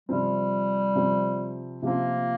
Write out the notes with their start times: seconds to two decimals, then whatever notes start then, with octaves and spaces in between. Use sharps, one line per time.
0.09 C3 F3 G3 C4
0.95 C3 F3 C4
1.82 C3 F3 A#3 C4